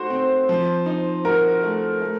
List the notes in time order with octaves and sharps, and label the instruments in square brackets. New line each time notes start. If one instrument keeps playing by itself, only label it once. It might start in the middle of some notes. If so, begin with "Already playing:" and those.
Already playing: [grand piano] A3 D#4 F#4 [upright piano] C5
[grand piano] C4
F3
D#4
[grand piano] F#4 [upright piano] A#4
[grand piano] A3
A3